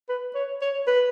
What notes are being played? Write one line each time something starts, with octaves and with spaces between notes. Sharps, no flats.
B4
C#5
C#5
B4